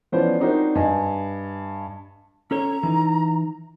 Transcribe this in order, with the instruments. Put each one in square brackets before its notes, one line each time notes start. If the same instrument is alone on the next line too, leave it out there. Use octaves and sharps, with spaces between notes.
[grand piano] E3 F3 B3 C#4 C5 D5
C4 D4 D#4 F#4 A#4 C5
G2 D#5 G#5
[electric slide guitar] C#4 A4 C#5 [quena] A#5
[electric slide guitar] E3 D#4